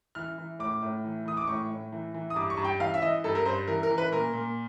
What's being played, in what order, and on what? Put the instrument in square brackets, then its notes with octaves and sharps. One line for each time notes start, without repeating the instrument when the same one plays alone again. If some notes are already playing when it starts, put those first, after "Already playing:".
[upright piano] E3 F6
E3
A2 D6
A2
E3
E3 D#6
D6
A2 C#6
A2
E3
E3
D#6
G2 D6
C#6
G2
G5
E3 F5
E5
E3 D#5
G2 A4
A#4
G2 C5
E3 A#4
A#4
E3
B4
A#2 A#4
A#2